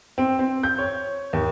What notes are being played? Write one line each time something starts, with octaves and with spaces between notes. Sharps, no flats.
C4
C4
G6
C#5
D#2